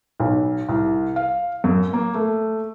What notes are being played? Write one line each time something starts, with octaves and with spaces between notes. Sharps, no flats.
B1
C2
F5
F#2
A#3
A3